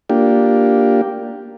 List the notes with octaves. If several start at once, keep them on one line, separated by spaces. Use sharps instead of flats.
A#3 D4 F4 G4